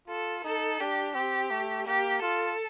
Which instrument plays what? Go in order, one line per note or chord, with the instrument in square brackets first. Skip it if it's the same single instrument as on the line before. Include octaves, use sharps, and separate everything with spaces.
[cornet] F4 [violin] A4
[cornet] D#4 [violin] A4
[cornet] D4 [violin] G4
[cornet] C4 [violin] G4
[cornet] A3
[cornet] A#3 [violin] G4
[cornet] F4 [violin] A4